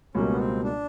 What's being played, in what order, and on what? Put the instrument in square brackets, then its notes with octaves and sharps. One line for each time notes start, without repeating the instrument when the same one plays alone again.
[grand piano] C#2 B2 G3 A#3 [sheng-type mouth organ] C#4
[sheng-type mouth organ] B3
C4
D4